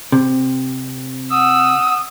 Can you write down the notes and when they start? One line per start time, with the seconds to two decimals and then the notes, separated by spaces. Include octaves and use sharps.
0.12 C3
1.31 F#5 D#6 E6